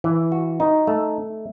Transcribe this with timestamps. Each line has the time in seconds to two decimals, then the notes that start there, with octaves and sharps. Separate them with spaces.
0.04 E3
0.32 F#4
0.60 D#4
0.87 A3